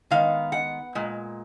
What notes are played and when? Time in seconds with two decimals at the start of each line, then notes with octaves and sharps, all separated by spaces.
0.11 D#3 G#3 B3 F5
0.52 F#5
0.95 A#2 G#3